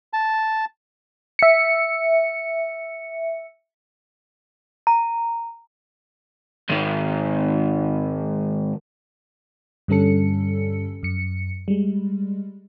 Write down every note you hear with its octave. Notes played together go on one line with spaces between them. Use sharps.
A5
E5 C#7
A#5
G#2 D#3
G2 D3 G3 C#4 A4 C#7
F#2 C#7
G3 G#3